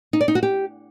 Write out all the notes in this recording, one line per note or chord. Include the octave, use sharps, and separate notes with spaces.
D#4
D5
D#4
F#4
G4